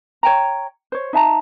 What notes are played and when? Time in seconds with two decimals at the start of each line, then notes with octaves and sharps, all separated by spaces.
0.23 C#5 G5 A#5
0.92 C5 C#5
1.13 D#4 E5 A5 A#5